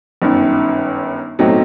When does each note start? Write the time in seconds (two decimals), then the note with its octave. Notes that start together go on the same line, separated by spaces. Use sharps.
0.22 G1 F#2 D#3
1.39 B1 A2 F#3 C4 D#4